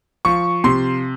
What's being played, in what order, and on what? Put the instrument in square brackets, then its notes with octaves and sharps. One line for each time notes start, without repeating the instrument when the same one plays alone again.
[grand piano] F3 C#6
C3 C6